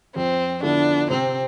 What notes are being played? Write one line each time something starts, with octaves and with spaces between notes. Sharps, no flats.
F2 C4
D3 F3 B3 D4 E4
C3 C4